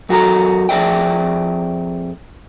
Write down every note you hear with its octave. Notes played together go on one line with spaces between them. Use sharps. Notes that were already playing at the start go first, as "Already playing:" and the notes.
F#2 F#4 G4 A4 A#5
F2 G#4 D5 E5 G5